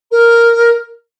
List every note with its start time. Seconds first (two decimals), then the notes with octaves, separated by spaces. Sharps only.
0.11 A#4